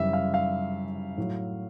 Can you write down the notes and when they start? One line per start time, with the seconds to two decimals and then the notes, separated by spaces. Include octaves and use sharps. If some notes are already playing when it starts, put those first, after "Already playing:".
Already playing: F#2 C#3 E3 G3 E5
0.13 F5
0.34 F5
1.18 A2 F#3